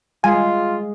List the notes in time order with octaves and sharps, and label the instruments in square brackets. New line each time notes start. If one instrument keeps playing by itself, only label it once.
[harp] G#3 [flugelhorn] F4 [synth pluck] G#5